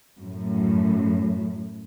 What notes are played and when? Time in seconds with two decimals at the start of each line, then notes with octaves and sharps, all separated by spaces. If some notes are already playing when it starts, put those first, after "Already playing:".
0.20 F#2 A2